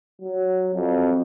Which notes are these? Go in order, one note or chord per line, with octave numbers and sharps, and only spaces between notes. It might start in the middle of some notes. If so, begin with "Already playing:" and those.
F#3
F2